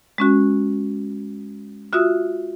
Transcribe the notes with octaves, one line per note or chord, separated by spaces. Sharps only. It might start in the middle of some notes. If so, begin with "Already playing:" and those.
G#3 C#4 F#4
F4 F#4 E5 D#6 E6